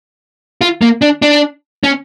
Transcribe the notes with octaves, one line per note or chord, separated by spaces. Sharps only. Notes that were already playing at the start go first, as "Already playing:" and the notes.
F4
A#3
D4
D4
C#4